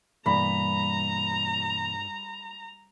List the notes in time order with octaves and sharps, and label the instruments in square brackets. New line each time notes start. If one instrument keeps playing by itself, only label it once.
[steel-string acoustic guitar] G2 [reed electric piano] B2 E3 A#3 [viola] A#5 [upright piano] B5